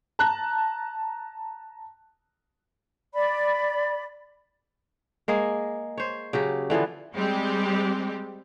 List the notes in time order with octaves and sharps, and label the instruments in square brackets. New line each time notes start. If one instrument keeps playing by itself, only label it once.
[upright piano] A5 A#5 F#6
[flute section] D5 B5
[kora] G#3 A#3 G#4
C5 C#5
C#3 F#3 G4
D3 E3 F3 B3
[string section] G3 G#3 C4 G4